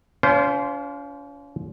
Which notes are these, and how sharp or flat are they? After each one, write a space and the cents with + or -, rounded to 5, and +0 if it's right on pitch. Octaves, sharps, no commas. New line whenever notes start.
C#4 +40 F4 -5 C5 -10